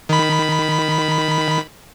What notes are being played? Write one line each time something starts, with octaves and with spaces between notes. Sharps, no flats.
D#3 B5